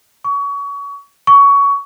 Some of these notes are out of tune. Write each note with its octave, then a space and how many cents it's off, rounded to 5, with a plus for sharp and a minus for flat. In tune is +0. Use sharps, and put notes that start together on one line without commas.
C#6 +30
C#6 +20